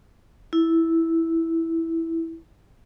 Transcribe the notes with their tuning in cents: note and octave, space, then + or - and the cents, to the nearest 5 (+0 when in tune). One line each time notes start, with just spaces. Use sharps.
E4 -5